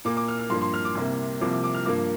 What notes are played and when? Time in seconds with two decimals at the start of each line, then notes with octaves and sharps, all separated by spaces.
0.05 A#2 A#3 D6
0.17 D6
0.28 F6
0.39 F6
0.50 G2 F3 A#3 C6
0.61 C6
0.74 F6
0.85 D6
0.95 C2 C3 A#3
1.41 C2 C3 F3 A#3 D6
1.53 D6
1.64 D6
1.74 F6
1.85 G2 F3 A#3 D6